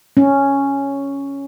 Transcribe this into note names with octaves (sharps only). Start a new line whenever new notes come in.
C#4